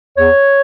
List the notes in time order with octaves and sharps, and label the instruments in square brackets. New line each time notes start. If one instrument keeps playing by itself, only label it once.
[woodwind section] E2 C#5